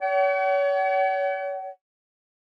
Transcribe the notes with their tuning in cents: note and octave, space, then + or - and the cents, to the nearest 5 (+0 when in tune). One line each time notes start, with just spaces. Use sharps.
C#5 +35 F#5 +45